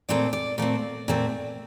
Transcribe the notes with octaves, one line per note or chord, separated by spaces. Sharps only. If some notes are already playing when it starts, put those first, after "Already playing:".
A#2 A3 C4 D5
D5
A#2 A3 C4 D5
A#2 A3 C4